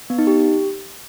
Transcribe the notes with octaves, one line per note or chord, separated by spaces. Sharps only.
B3
D#4
G4